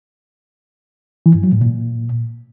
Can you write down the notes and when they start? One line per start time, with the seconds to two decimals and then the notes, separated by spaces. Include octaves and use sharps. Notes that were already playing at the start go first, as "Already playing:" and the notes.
1.26 E3
1.35 G2
1.44 F#3
1.52 A2
1.61 A#2